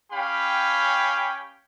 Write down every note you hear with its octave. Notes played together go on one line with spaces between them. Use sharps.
C#4 G4 F5 G5 B5